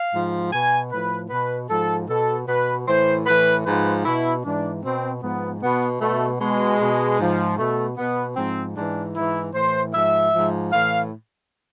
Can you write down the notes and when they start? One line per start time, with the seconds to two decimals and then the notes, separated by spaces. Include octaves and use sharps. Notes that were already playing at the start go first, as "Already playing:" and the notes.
Already playing: F5
0.13 G#2 F3
0.51 B2 G#5
0.90 A2 F3 B4
1.30 B2 B4
1.69 G#2 F3 A4
2.08 B2 A4
2.47 B2 B4
2.87 A2 E3 C5
3.26 A2 E3 B4
3.65 G#2 F3 B4
4.05 B2 E4
4.43 G#2 E3 D4
4.83 B2 C4
5.21 G#2 F3 B3
5.61 B2 B3
6.00 B2 A3
6.40 B2 G#3
6.79 B2
7.18 G#2 F3
7.57 B2 A3
7.97 B2 B3
8.35 G#2 F3 C4
8.75 G#2 E3 D4
9.14 G#2 E3 E4
9.53 A2 E3 C5
9.93 G#2 F3 E5
10.32 G#2 F3
10.71 A2 E3 F5